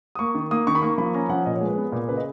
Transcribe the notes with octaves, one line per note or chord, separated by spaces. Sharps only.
D#6
A#3 C#6
D#3
A#3 D#6
D#3 C#6
B5
A#3 C#6
F3 B5
C#4 A#5
F3 F#5
A#2 D#5
C#5
G#3
B4
B3
A#2
C#3 B4
D#5